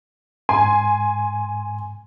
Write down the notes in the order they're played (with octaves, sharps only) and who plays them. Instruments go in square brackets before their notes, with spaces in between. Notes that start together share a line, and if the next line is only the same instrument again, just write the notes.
[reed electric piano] G#2 C6 [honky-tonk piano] G#5